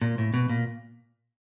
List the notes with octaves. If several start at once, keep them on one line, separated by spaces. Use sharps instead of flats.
A#2
A2
B2
A#2